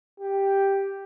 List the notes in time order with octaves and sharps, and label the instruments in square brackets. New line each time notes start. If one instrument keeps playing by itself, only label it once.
[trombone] G4